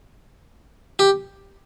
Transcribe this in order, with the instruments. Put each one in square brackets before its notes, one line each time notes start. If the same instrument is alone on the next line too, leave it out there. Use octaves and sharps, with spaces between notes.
[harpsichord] G4